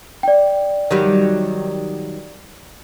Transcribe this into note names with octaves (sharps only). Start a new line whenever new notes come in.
D5 G5
D#3 F#3 G3